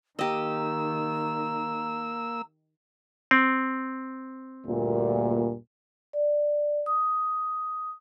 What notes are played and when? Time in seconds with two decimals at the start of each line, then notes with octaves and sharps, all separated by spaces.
0.19 D#3 A#3 G4 D#5 A#5 E6
3.31 C4
4.66 D2 G2 A#2
6.13 D5
6.86 D#6